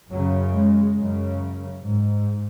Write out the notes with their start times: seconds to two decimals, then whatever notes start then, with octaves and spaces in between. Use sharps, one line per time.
0.10 F#2 C#3 F#3
0.53 G#3
0.97 F#2 C#3
1.83 G#2